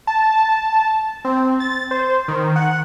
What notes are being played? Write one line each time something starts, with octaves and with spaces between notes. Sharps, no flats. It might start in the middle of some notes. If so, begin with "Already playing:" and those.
A5
C4
A6
C5
D#3
F#5